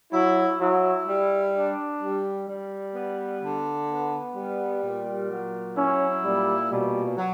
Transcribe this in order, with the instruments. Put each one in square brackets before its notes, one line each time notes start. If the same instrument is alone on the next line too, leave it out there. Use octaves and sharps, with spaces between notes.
[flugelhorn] F#3 [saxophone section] E4
[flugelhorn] F#3 [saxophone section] E4
[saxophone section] G3
D4
G3
G3
B3
D3
B3
G3
A#2
F#3
[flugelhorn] C#4 [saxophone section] E4
[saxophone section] A#2 [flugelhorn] G3
[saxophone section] B2 [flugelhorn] G3
[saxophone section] F#3